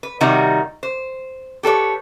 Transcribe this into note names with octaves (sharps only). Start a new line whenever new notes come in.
B4
C3 D#3 G3 D#4 F#4
C5
G4 A4 B4 C#5